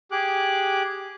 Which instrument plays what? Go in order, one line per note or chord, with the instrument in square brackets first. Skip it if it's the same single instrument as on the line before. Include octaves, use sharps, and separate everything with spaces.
[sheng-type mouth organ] G4 G#4 D6 F#6